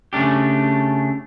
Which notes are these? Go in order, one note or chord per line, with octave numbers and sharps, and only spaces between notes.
C#3 A3 D4 G4